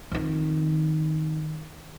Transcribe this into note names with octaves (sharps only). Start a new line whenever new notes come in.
F2 D#3